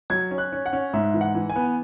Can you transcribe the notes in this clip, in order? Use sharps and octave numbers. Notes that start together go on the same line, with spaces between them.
F#3 G#6
C#4
F#6
C#4
F#5
C#4
G#2 E5
E3
F#5
E3
G#5
B3